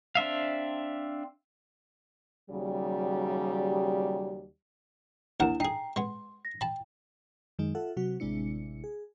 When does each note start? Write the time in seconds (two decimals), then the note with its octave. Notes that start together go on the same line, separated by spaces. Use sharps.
0.15 C4 D4 E5 F5
2.51 D#2 C#3 F#3 G3
5.40 D#2 D4 E4 A#4 F#5 E7
5.60 D#4 G#4 G5 A#5 C7
5.96 G#3 B3 C6
6.45 A#6
6.61 G5 A5 B5
7.59 F#2 D#3 G#3 D#4
7.75 F4 A4 E5 F#5
7.97 C3 F#3 F#4
8.20 A1 C3 G#3 D4 E4 C#7
8.84 G#4